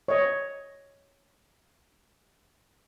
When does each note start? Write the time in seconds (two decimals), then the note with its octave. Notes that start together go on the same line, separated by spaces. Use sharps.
0.08 C#5 D#5